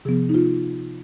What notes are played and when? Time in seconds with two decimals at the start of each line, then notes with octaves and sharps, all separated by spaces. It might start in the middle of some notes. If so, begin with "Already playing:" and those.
0.05 C3 F3 B3 G#4
0.29 D#4
0.34 F4